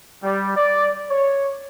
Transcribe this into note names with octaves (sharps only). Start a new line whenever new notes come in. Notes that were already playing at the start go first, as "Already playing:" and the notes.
G3
D5
C#5